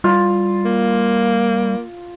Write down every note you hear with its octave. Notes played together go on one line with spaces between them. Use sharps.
G3 F4
A#3